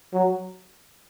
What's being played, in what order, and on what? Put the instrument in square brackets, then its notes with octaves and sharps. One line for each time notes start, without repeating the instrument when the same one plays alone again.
[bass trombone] F#3